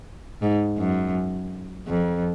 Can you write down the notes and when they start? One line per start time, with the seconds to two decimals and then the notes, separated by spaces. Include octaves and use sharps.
0.42 G#2
0.78 F#2
1.87 F2